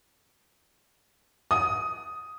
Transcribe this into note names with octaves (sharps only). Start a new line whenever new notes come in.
D#6